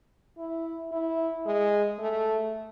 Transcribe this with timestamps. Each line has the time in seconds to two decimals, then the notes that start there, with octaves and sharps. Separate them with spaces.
0.38 E4
0.91 E4
1.46 G#3
1.99 A3